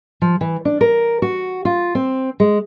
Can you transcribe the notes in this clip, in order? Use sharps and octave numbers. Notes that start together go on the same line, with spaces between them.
F3
E3
D4
A#4
F#4
F4
C4
G#3